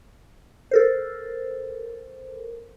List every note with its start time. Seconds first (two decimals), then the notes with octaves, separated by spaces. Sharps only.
0.71 A4 A#4 C5